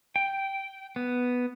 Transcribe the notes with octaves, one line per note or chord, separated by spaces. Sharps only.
G5
B3